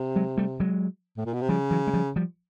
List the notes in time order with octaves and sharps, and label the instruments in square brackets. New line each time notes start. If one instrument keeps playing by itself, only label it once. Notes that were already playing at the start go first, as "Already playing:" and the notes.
Already playing: [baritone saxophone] C3
[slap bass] F#3 G#3
G3 A3
F#3 G#3
[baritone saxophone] A2
A#2
B2
C3
[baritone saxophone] C#3 [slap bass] F3 G3
[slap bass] E3 F#3
G#3
F3 G3
F3 G3